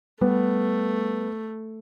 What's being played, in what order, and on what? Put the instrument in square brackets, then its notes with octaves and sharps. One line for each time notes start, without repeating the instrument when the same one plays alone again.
[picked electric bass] G3 [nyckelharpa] A3 [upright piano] B3